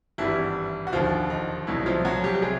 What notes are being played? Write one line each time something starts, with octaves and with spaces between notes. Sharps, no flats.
G#1 G2 E3 G3 E4
F#4
E1 D#2 D3 F3 F4
D#4
C2 B2 F#3 A3 E4
F3 F4
F#3 F#4
G3 G4
G4
C3 G#3 G#4